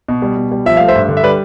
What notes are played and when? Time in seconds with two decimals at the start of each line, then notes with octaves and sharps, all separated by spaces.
0.08 B2
0.22 G3
0.37 B2
0.51 G3
0.66 F3 E5
0.77 A3 F5
0.88 C5 E5
0.95 G2
1.09 D3
1.17 E5
1.24 G3 B4 D5